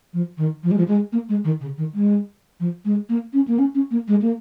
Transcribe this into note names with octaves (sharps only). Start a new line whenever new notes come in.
F3
D#3
F3
G#3
F3
G#3
A#3
G#3
D#3
C#3
D#3
G#3
F3
G#3
A#3
C#4
A#3
C#4
C#4
A#3
G#3
A#3